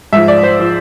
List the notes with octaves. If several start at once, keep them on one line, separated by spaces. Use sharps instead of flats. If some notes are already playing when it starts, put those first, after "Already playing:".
G#2 F3 E5
D5
C5
F3